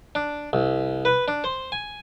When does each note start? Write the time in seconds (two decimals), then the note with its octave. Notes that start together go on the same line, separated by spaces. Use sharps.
0.15 D4
0.53 C2
1.05 B4
1.28 D4
1.44 C5
1.72 G#5